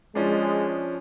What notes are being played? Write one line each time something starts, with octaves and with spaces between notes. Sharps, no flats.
F3 G#3 C#4 D4